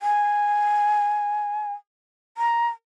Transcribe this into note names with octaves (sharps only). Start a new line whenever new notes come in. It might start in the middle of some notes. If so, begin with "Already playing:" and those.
G#5
A#5